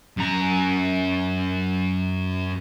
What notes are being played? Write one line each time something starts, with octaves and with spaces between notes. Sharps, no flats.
F#2 A#5